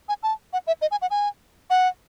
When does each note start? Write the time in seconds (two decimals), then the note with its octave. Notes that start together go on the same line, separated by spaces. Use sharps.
0.09 G#5
0.23 A5
0.53 F#5
0.67 E5
0.81 D#5
0.91 G#5
1.02 F#5
1.11 G#5
1.70 F#5